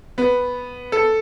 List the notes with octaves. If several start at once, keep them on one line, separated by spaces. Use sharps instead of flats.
B3
A4